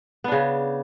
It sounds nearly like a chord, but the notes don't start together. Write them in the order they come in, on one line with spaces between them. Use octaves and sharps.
B3 D4 C#3